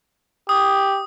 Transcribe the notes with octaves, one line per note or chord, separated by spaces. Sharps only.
G4 D#6